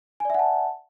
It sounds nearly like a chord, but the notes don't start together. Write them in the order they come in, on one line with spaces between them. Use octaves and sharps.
G#5 D5 E5 F#5 A5